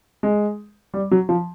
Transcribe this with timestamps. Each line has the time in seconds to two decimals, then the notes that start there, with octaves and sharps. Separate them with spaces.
0.23 G#3
0.94 G3
1.11 F#3
1.29 F3